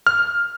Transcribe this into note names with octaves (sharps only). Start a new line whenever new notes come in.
F6